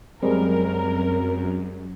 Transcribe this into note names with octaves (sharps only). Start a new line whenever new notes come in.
F#2 G3 G#3 C4 A#4